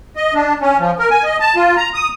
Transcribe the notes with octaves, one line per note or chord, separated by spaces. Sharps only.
D#5
D4
C#4
F3
A#4
G#5
D#5
A5
F4
A#5
D#6